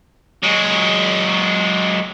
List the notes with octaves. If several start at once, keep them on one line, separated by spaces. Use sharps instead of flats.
F#3 G#3